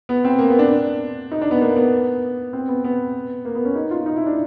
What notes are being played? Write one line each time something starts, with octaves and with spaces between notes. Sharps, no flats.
B3
C4
A#3
B3
D4
D#4
D4
B3
A#3
B3
C4
B3
B3
A#3
B3
C#4
D#4
F4
D#4
E4
D4